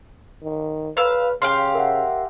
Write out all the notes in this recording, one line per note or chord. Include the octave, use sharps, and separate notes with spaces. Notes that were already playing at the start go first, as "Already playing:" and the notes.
D#3
B4 F5 E6
C#3 G4 F5 C6
A#4 E5 F#5